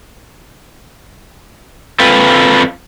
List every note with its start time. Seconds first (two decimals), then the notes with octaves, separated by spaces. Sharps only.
2.00 C4 F4 A4 B4